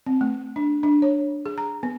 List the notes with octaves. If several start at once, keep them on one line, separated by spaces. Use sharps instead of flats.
C4
A3
D4
D4
C#5
G#4
A#5
B3